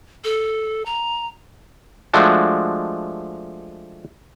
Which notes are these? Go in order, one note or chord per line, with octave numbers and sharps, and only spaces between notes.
A4
A#5
F3 G#3 A3 D4 F#4